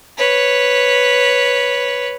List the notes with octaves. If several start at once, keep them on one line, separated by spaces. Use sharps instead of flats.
B4 C#5